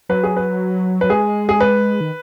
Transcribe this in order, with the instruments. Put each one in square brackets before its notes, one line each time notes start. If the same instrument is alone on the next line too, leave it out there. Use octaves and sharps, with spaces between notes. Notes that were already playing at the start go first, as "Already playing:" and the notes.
[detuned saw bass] F#3 [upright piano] B4
[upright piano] G#4
B4
[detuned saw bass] F#3 [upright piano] B4
[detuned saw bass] G#3 [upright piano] G#4
[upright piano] G#4
B4
[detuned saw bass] D#3